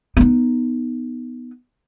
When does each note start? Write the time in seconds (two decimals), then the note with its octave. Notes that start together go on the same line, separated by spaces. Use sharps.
0.17 B3 D#4